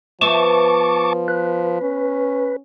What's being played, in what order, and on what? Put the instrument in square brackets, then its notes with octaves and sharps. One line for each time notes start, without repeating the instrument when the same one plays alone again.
[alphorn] F3 [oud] B3 C4 E5 [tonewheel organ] A5 C#6 D6
[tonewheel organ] B4
[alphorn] C#4